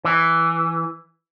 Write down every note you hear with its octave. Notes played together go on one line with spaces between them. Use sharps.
E3